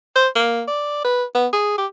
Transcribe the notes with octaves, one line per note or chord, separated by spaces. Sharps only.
C5
A#3
D5
B4
B3
G#4
G4